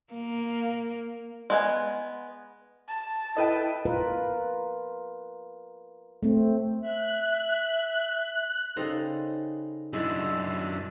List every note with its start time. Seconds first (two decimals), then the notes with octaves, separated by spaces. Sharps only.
0.14 A#3
1.50 G#3 B3 G#5
2.88 A5
3.37 E4 A4 B4 D#5 G5
3.85 F4 A#4 B4
6.23 A3 C4
6.82 E5 F#6
8.76 C#3 G3 D#4 A4 C5 A#5
9.93 F#2 G#3 D4 E4 E6